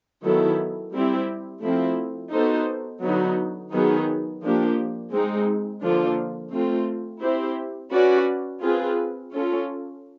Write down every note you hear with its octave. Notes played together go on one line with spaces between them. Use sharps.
D#3 F#3 B3 E4 A4
G3 C4 E4 G4
F3 A3 C4 E4
B3 D#4 F#4 A4 C5
D3 F#3 B3 D#4 F#4
D#3 F#3 B3 D#4 G#4
F3 A#3 D4 G4
G#3 C4 D#4
D3 F3 A#3 D4 F4
A3 C4 F4
C4 E4 G4 C5
C#4 F#4 B4 D5
C4 F4 G#4 B4
C#4 F4 A4